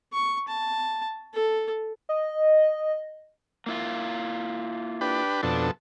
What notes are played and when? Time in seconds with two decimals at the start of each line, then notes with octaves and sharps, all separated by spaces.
0.13 C#6
0.48 A5
1.34 A4
2.09 D#5
3.66 A#3 E4 F4
5.01 D4 G4 B4
5.43 F2 B2 D4 A4